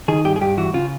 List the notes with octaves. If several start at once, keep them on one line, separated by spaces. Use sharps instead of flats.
D#3 G#4
G2 G4
G#4
G2 G4
E3 F#4
C#3 F4